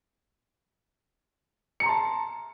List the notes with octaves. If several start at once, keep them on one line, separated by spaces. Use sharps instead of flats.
A5 A#5 C6 C#7